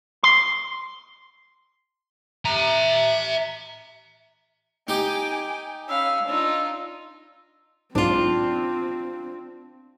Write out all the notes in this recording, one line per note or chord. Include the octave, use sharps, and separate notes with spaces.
C6
E5 A#5
D#4 G4 G5 G#5 D6
C#4 F5 B5 E6
D4 D#4 F4 E6
B1 G#2 C4 D4 F4